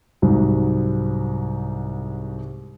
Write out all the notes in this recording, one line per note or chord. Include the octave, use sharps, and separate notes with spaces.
C2 G#2 F#3